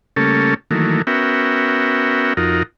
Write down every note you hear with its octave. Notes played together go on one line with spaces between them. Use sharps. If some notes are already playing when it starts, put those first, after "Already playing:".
C#3 G3 A3 A#3 C#4 A4
D#3 E3 F#3 A3 A#3
B3 C#4 F#4 A#4 E5 G5
F2 D#4 F4 F#4 A#4